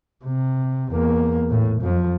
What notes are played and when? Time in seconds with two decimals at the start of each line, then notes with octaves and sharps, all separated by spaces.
0.25 C3
0.92 E2 A#3
1.50 A2
1.82 F2 F3